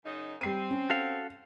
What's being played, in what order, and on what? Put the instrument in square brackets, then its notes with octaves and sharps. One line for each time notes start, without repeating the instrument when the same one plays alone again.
[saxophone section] F#2 C#3 D#4
[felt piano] G3 C7 D#7 [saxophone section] C4
[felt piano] C#4
[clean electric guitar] F#4 A4 F5